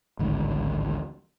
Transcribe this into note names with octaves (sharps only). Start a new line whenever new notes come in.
A1 D2 G#2 D#3